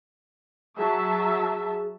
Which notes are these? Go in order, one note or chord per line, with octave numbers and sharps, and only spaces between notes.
F#3 G#4 E5 A5